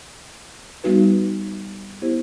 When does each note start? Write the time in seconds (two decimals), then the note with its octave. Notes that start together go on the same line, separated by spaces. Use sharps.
0.84 G3 B3 D#4 F#4 B4
2.02 B3 E4 G4 C5